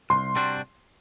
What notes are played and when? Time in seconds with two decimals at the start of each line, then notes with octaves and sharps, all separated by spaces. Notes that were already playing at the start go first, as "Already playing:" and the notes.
0.10 C2 C6
0.36 C3 G3 D4 F#4